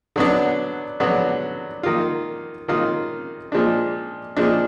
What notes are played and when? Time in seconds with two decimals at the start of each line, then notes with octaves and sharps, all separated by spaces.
0.16 D3 F#3 B3 D4
1.00 D3 F#3 B3 D4
1.83 D#3 A#3 F4
2.68 D#3 A#3 F4
3.52 A#2 F3 G#3 D4
4.37 A#2 F3 G#3 D4